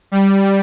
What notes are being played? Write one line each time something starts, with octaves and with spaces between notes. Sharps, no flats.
G3